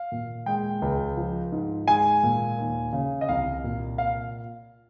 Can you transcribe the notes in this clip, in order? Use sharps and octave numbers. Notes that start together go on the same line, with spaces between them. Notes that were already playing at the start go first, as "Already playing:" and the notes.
Already playing: F5
A#2
G#3 G5
C#2
F3
G#2
G#3 G#5
A#2
D#2
C#3
D#5
C2 F5
A#2
F5